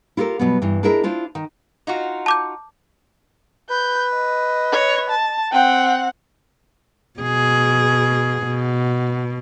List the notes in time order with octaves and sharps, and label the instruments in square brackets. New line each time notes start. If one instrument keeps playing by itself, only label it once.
[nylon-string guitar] E4 F4 G4 A4 A#4
B2 F#3 G3 B3
G2 E3
D4 E4 G#4 A#4 D#5 E5
D4 E4 F4 C5
D#3
[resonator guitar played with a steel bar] D#4 F4 F#4
[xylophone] A5 D6 G6
[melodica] B4 [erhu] G6
[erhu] D#5
[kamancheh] C#5
A5
[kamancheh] C4 F#5 [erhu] G5
[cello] B2 G#4
B2